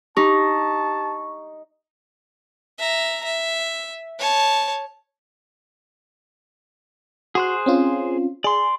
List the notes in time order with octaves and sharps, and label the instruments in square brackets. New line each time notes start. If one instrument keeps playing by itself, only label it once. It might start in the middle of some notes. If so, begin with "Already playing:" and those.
[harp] D#4 [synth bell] G4 [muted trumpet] A5 [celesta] C#6
[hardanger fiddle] E5 A#5
E5
C#5 A5
[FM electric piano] F#4 [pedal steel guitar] G#4 C5 F#6
[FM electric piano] C4 C#4 F4
[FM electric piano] G#4 [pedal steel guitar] D5 C6